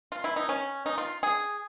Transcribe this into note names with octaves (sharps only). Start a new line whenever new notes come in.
F4
E4
D#4
C#4
D#4
F4
G#4